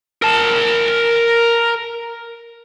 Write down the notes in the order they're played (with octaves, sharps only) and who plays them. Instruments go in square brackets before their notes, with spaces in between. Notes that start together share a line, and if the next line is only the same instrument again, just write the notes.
[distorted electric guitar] A#4 A5